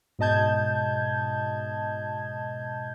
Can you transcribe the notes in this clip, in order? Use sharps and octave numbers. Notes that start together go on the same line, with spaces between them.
G#2 B2 D#5 A5 G6 G#6